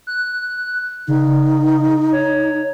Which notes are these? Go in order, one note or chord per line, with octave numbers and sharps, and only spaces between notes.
F#6
C#3 D#4
C#5